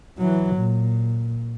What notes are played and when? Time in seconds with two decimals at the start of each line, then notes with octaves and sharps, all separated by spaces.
0.18 E3 F#3
0.55 A#2